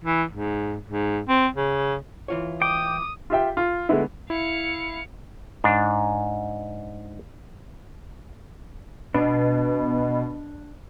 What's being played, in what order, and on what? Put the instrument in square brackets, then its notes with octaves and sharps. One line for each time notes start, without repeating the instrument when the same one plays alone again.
[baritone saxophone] E3
G#2
G#2
C4
C#3
[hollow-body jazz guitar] E3 F4 C#5
[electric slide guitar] G5 [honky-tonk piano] D6 [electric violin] D#6
[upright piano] F4 G4 E5 G5
F4
D3 G#3 A3 B3 E4
[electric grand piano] E4 [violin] F5 C#7
[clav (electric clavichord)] G#2 D4
[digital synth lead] B2 [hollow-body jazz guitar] D4